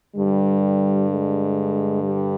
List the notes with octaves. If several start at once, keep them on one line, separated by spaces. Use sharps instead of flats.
G2 D3 G3
G#3
G3